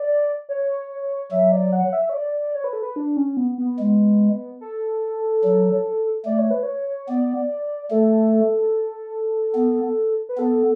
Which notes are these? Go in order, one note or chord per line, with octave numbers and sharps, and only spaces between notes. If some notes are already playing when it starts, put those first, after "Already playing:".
Already playing: D5
C#5
F#3 E5
D5
F#5
E5
C#5
D5
C#5
B4
A4
B4
D4
C#4
B3
B3
G#3
A4
F#3
A3 D5
C#5
B4
C#5
B3 D5
A3 A4
B3
B4
B3 A4